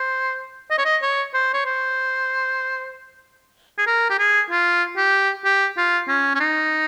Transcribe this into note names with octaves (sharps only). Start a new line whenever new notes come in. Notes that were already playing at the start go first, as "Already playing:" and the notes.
Already playing: C5
D#5
C#5
D#5
C#5
C5
C#5
C5
G#4
A#4
G4
G#4
F4
G4
G4
F4
C#4
C#4
D#4